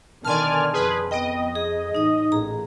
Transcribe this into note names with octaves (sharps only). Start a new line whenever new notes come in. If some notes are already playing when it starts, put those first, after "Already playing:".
B2 D3 D#3 D5 G#5 A5 C6 F6
F2 G#4 B4
B3 D#5 G5
G#4
A1 D#4 D#6
A1 A#2 G#4 A#5